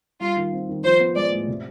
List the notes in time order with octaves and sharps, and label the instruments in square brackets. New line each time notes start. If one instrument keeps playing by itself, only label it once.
[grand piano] G3 [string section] F4
[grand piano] D#3
C4
D#3
[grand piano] F3 [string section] C5
[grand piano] B3
[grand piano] G#3 [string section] D5
[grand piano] A2
C3